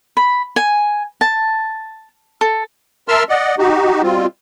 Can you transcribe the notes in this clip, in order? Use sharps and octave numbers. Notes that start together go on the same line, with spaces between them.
B5
G#5
A5
A4
A#4 E5 A5 C6 E6 F6
D5 D#5 F#5
D#4 F#4 G4
B2 G3 C4 F4